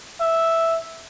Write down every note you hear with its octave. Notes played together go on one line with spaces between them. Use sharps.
E5